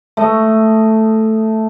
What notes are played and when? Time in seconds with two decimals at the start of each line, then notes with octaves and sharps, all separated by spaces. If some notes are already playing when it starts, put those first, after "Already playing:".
0.17 A3 D#5